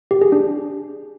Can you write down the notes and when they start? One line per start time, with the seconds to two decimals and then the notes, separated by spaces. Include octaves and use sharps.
0.11 G4
0.22 G#4
0.32 D4